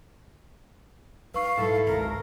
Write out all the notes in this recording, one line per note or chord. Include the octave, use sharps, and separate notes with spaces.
D#4 B4 F5 C#6
G#2 F#3 E4 A4
G#1 C#2 A#4